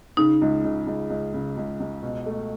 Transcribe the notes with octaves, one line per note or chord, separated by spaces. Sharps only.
C#3 D#4
C#2
C#2
C#2
C#2
C#3
C#2
C#2
B2
A3